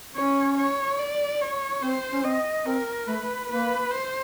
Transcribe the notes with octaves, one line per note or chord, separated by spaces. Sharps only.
C#4 C#5
C#5
D5
C#5
C4 C5
C#4
C4 D#5
C4 A#4
A3 B4
A#3 B4
C5